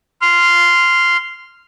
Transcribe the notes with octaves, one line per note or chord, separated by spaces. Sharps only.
C6 F6